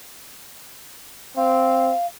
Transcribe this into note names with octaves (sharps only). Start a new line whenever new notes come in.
C4 F5